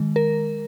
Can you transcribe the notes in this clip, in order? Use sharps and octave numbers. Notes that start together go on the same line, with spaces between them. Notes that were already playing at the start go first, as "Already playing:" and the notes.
Already playing: D#3 G#3
A#4